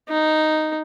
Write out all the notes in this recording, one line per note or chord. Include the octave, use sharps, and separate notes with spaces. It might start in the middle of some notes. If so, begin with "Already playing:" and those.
D#4